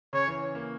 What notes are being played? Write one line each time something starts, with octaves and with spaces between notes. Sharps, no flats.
C#3 C#5
E3
A#3